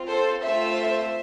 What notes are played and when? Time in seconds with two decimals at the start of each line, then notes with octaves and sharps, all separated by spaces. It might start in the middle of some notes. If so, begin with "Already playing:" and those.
Already playing: C4 F4
0.08 A4 C5
0.44 A3 C4 F4 A4 C5 E5